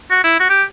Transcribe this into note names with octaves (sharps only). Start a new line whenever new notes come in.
F#4
E4
F#4
G4